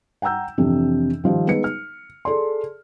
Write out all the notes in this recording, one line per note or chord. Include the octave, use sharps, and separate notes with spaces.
F#5 G5 A#5 E6 G6
F2 C3 E3 D4
D#3 F3 G3 C5
G#3 B3 D#4 B4 C#7
F6
G#4 A4 D5 C6